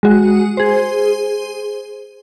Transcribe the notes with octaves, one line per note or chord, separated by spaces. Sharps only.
G#3 F#4
G#4 C5